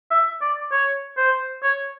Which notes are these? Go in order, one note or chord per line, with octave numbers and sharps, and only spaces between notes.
E5
D5
C#5
C5
C#5